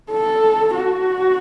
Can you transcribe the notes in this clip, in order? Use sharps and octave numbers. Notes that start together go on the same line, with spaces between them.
A4
F#4